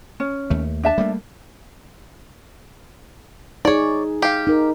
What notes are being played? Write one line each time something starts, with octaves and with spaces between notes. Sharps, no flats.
C#4
D#2 A3
D4 E5 A5
G3 A3 A#3
D#4 G#4 C#5 D5
G4 F5
D#4 A#4